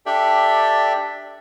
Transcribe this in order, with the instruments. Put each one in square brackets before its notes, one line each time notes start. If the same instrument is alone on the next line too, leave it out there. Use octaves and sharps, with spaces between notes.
[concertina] D4 G4 A4 D5 E5 G5